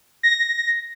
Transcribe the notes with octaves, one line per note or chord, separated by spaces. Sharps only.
A#6